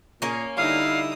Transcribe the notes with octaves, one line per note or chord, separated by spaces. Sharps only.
A#2 A#3 C#4 G#4
D3 G3 D#4 E4 F5 D#6